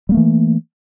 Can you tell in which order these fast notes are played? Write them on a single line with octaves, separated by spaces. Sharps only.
G3 A#3 A3 E3